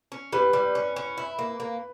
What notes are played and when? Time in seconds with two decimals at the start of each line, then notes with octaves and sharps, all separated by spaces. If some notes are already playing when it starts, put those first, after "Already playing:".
0.12 C#4
0.33 G3 B4
0.53 G3
0.75 C#4
0.96 C#4
1.18 E4
1.39 A#3
1.60 A#3